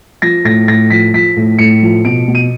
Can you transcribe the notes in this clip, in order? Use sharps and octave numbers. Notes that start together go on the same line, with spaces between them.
F3 A#6
A2 A#6
A2 A#6
F3 B6
F3 B6
A2
A2 C#7
F3
B2 D7
B2
D#7